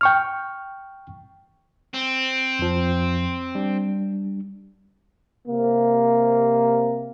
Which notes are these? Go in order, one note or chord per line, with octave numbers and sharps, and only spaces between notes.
G5 C#6 F6
C4
F2 F3
G3 D4
C3 A#3